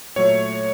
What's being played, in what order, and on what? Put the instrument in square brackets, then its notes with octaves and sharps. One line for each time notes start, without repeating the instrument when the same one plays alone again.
[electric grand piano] A#2 F#3 A3 C#5